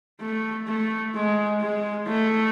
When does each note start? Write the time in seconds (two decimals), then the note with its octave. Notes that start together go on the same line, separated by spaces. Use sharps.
0.20 A3
0.67 A3
1.15 G#3
1.61 G#3
2.08 A3